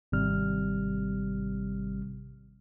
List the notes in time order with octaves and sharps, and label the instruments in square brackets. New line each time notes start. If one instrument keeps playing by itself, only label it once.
[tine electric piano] G#1 C3 G3 F6